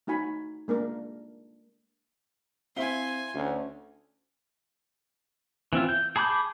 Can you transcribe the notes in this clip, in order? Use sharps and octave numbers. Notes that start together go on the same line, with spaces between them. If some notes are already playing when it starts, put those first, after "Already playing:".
A3 D#4 F#4 G#5 B5
G#3 A#3 D4 A#4
C4 E4 E5 F5 G#5 C6 G7
D2 C#4
E3 C4 E4 F4
G6
G#4 A5 B5 D6 G6